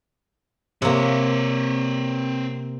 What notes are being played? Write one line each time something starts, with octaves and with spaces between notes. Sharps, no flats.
C3 A#3 C4 C#5